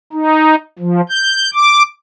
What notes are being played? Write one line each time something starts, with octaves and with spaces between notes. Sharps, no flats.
D#4
F3
G6
D6